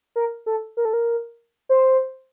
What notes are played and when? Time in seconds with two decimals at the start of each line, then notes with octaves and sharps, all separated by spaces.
0.16 A#4
0.46 A4
0.77 A#4
0.85 A4
0.93 A#4
1.69 C5